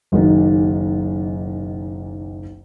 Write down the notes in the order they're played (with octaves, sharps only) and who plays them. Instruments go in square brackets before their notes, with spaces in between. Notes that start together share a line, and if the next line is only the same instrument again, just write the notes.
[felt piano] F#1 B1 D#3